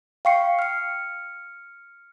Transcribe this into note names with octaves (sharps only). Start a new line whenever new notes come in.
F5 G5 C#6 C7 C#7
F6 C#7